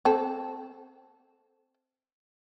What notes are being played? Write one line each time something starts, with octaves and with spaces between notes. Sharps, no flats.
C4 A4